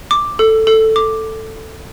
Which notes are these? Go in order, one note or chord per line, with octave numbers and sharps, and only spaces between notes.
D6
A4
A4
D6